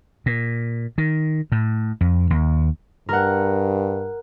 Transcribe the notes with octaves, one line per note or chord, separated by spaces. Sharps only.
A#2
D#3
A2
F2
D#2
G2 A#4 F#5